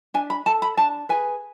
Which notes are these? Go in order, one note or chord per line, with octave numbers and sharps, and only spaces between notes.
D4 G#5
B5
A4 A5
B5
D4 A5
G#4 B4 G#5